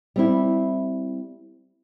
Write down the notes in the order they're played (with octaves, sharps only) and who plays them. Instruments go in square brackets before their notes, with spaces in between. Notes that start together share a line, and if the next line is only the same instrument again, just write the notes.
[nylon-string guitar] G3 C4 E4